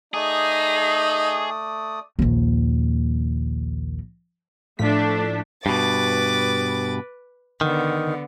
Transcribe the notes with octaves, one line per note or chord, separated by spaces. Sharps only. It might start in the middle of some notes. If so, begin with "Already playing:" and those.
A3 D#4 G#4 D5 D#6
A#1 D#2
A2 F3 A3 D4 B6
G2 B2 B4 D6 A6
D3 D#3 B3